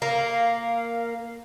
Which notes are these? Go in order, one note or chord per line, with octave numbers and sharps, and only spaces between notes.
A#3 F5